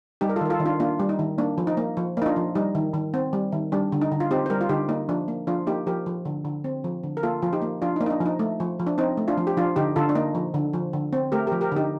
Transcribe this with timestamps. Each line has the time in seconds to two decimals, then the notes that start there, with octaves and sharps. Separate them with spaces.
0.21 G3 D#4 G4
0.29 A#4
0.36 F4 A4
0.41 D#3 A#4
0.50 F4 A4
0.60 D#3
0.65 D4 F4
0.80 A#3 D4 F4
0.99 G3
1.09 D#4
1.19 D#3
1.38 A#3 D4
1.58 F3
1.67 D#4
1.77 A#3
1.97 F3
2.17 A#3 D#4
2.26 D4 F4
2.36 F3
2.55 G3 D#4
2.75 D#3
2.94 D#3
3.14 C4
3.33 G3
3.52 D#3
3.72 G3 D4
3.92 D3
4.01 D#4
4.12 D3
4.20 F4
4.31 C4 D#4 G4
4.46 C5
4.50 G3 G4 A#4
4.61 F4
4.69 D3 D#4 G4
4.89 A#3 D#4
5.09 F3 D4
5.28 A#3
5.47 F3 D4 F4
5.67 A#3 D#4 G4
5.87 F3 G4 A#4
6.06 F3
6.25 D3
6.45 D3
6.64 C4
6.84 F3
7.03 D3
7.17 A#4
7.23 A#3 F4 A4
7.42 F3 F4
7.53 D#4 G4
7.62 A#3
7.82 F3 D4 F4
7.96 D#4
8.01 A#3
8.06 D#4
8.10 D4
8.20 F3
8.26 D#4
8.39 A3
8.60 F3
8.80 F3
8.87 D4
8.98 C4 D#4
9.17 A3
9.28 D4 F4
9.38 F3
9.47 G4
9.57 F3 D4 F4
9.76 D3 D#4 G4
9.96 D3 F4 A4
10.09 D4
10.15 A#3 D#4
10.35 F3
10.54 D3
10.73 F3
10.93 D3
11.13 C4
11.32 A3 G4 A#4
11.47 G4 A#4
11.52 F3
11.61 G4 A#4
11.72 D3 D#4 G4